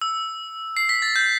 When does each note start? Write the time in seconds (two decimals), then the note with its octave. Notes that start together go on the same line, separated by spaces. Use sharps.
0.01 E6
0.77 C7
0.89 B6
1.02 A6
1.16 G6